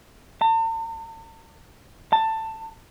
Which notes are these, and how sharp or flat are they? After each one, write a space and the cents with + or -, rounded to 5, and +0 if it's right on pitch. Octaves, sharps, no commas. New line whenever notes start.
A5 +45
A5 +15